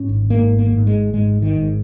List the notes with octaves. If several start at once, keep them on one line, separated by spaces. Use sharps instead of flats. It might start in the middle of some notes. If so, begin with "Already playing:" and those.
Already playing: G#2 C#4
G#1
G#2 A#3
G#1
A#3
G#2
G#3
G#1
G#2 G#3
G#1
D#3
G#2